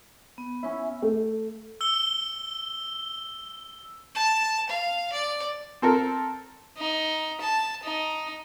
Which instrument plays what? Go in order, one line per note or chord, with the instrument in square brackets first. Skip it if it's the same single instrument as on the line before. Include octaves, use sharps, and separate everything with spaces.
[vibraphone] B3
[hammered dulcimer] C#4 E4
[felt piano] A3
[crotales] E6 G7
[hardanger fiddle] A5
F5
D5
[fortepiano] C4 A4 A#4
[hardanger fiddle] D#4
A5
D#4